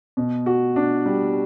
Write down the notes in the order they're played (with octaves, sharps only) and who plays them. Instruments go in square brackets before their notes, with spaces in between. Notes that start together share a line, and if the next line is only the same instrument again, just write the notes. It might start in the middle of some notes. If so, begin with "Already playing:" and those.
[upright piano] B2
F#4
D4
G3